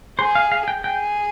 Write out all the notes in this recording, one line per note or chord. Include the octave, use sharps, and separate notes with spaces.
G#4 C5
F5
F5
G5
G#4 G5